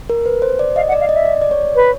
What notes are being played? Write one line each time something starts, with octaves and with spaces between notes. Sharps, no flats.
A#4
B4
C5
D5
D#5 F5
F#5
D5
F5
D#5
E5
D5
D5
C#5
B4